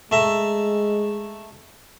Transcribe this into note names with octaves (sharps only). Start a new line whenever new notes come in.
G#3 A3 E5 A#5